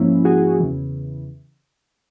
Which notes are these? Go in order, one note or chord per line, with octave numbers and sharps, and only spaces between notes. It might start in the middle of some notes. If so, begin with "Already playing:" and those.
Already playing: G#2 F3 A#3 C#4 E4
F#4 G#4
E2 C#3 E3